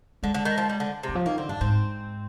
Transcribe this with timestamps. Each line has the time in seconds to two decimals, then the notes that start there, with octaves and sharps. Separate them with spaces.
0.23 D3 G#3
0.34 D3
0.45 D#3
0.58 F3
0.69 G3
0.80 D3
1.03 C3
1.09 D#3
1.15 F3
1.26 D#3 A#3
1.38 D3 C4
1.49 G2 D4
1.61 G#2 C4